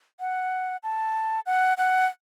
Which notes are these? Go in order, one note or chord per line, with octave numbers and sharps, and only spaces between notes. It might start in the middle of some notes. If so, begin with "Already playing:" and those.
F#5
A5
F#5
F#5